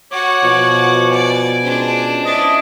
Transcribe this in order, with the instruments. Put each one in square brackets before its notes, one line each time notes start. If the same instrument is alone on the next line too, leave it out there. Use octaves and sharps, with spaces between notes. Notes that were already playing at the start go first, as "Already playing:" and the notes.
[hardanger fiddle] F#4 F#5 [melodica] C#5 D6
[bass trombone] B2 [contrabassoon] F3
[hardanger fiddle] D5 [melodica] G#5
[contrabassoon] C#2 [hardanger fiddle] D4 C5
[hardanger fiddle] D4 E4 [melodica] D#5